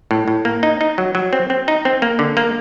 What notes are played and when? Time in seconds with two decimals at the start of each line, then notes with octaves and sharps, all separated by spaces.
0.11 A2
0.28 A2
0.45 A#3
0.63 D#4
0.81 D#4
0.98 F#3
1.15 F#3
1.33 C4
1.50 C4
1.68 D#4
1.85 C4
2.02 A#3
2.19 D3
2.37 A#3